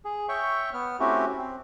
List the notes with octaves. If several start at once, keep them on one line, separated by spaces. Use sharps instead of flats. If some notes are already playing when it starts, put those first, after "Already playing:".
G#4
C#5 E5 G5 C#6
B3 F6
A3 C4 C#4 E4 F#4 G4
C4